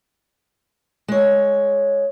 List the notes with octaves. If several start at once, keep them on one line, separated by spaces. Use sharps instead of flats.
G#3 C#5